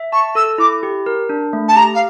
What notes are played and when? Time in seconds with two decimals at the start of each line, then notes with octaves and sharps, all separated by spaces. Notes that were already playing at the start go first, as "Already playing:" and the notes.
Already playing: E5
0.12 A5 C#6
0.35 A4 E6
0.58 E4 D6
0.83 G4
1.06 A#4
1.29 D4
1.53 A3
1.68 A5
1.76 G4 A#5
1.94 F5